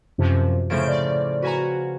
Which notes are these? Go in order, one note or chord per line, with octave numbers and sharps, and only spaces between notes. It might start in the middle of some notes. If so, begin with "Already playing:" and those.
F#2 C3 F3
A2 C#3 F3 G6 D7
D5
F#4 B4 G#5 A#5